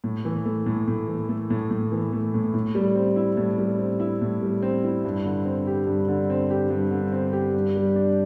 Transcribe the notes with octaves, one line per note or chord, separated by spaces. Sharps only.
A2
E3
A3
A2
A2
E3
A3
A2
A2
E3
A3
A2
A2
G3
C4
E4
A2
G3
C4
E4
A2
G3
C4
E4
G2
D3
C4
G4
G2
D3
C4
G4
G2
D3
C4
G4
G2
G3
D4